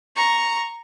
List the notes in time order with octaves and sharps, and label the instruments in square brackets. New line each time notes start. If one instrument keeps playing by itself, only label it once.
[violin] A#5 C#6